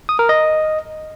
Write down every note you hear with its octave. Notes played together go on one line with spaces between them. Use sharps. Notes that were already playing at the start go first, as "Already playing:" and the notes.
D#6
A#4
D#5